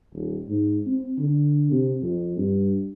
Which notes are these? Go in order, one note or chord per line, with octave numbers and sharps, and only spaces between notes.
D#1
G#2
C4
D3
C3
F2
G2